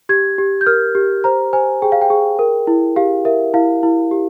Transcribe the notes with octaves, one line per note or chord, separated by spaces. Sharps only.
G4 G#6
G4
G6
A#4 F6
G4
C5 A#5
C5 G#5
G#4 G5
F5
G5
G#4
A#4
E4
G4 F5
A#4 E5
E4 F5
E4
G4